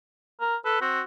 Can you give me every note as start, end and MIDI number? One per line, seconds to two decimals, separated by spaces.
0.41 0.56 70
0.65 0.81 69
0.65 0.81 71
0.81 1.01 60
0.81 1.03 66